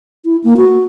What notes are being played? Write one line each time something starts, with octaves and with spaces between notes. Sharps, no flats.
E4
A#3
F#4